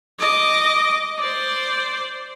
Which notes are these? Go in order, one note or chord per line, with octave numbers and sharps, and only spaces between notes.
D#5 D6
C5 D5